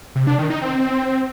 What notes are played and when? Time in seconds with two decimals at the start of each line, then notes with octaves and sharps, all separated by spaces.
0.15 C3
0.27 D4
0.39 D#3
0.50 D#4
0.62 C4